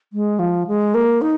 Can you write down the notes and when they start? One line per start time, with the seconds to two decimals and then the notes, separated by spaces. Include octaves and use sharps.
0.13 G#3
0.39 F3
0.67 G#3
0.94 A#3
1.22 D#4